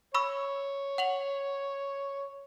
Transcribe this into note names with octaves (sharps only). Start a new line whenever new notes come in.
C#5 B5 C#6 E6
F#5 F7 F#7